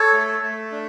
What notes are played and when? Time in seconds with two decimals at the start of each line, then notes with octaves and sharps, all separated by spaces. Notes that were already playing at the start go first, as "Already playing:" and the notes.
Already playing: A4 C#5
0.13 A3
0.43 A3
0.71 D4